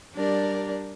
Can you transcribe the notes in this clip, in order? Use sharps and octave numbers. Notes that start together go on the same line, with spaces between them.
G3 D4 G4 A#4 D5